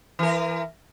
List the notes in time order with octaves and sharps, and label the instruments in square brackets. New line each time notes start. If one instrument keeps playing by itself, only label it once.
[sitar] E3 A#4